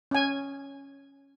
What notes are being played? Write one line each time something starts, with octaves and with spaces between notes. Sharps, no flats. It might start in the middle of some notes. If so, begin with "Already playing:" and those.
C#4 G#5